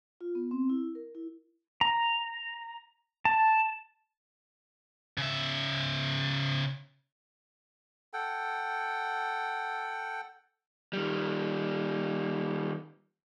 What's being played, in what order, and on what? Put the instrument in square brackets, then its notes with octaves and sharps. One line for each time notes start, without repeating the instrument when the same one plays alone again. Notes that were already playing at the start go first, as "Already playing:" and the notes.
[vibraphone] F4
B3
C4
E4
A#4
E4
[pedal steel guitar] A#5
A5
[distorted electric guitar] C#3 E5
[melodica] A4 F#5 G5
[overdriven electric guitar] D#3 G3